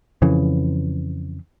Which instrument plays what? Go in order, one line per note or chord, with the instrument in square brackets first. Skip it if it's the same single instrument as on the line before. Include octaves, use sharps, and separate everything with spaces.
[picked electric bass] F2 C#3 E3